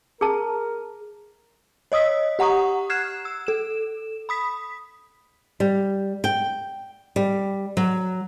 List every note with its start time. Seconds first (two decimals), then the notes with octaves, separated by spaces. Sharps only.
0.21 G#4 A#4 A5
1.92 C#5 D#5 D#6 E6 B6
2.39 G4 F#5 A#5 C#6 D#6
2.90 F6 F#6 G#6 C7 E7
3.25 E6
3.47 A4 E7
4.29 B5 D#6 B6
5.60 G3
6.24 G5
7.16 G3
7.77 F#3